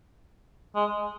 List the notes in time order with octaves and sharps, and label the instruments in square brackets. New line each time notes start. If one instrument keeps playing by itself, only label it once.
[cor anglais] G#3